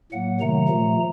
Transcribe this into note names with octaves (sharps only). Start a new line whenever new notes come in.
A2 F#3 A#3 F#5
C3 D#3 F#3 A3 A#5
A#2 F3 A3